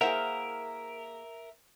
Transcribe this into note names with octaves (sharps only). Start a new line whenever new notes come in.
A#3 E4 G#4 A#4 C5 E5 F#5